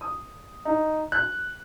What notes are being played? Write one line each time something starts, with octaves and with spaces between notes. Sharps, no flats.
D#6
D#4
F#6